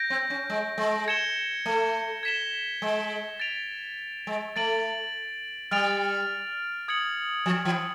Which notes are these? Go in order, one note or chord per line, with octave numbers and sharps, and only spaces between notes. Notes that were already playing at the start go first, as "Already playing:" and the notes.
Already playing: G6 A#6 D7
C4
C#4
G#3
G#3
G#6 C#7 E7 G7
A3
G#6 B6 E7 G7
G#3
A6 D7 F7
G#3
A3 A6 D7 F#7
G3 F6 A6 D7 F7
D#6 G#6 C#7 F#7
F3
E3